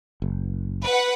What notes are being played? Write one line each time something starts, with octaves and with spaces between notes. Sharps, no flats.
F#1
B4 F#5